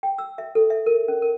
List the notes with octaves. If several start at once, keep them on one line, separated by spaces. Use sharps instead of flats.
G5
E6
E5
A4
E5
A#4
C#4
A#4